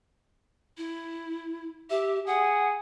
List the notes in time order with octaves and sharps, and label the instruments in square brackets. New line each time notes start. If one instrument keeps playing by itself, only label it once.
[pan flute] E4
[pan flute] G4 [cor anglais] E5
[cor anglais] G#4 [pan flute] F#5